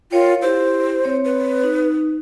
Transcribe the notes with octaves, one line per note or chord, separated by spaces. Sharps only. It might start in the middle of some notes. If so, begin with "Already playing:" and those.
F4 A#4 C#5 G5
E4 G4 C5
C4 C#5
B4
D#4